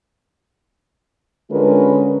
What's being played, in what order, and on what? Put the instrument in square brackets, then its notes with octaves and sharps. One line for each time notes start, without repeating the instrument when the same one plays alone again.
[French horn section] D3 G#3 C#4 F4 A#4 B4